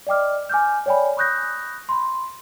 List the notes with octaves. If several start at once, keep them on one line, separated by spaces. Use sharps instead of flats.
D5 D#5 G5 D6 F6
G#5 D6 F6 G6
C#5 D5 G5 G#5 B5
B5 C#6 D#6 F#6 G6 A#6
B5 C6